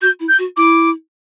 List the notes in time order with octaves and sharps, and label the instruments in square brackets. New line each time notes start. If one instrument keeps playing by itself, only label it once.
[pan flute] F#4 [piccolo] G6
[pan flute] E4
[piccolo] G6
[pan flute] F#4
[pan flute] E4 [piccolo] D6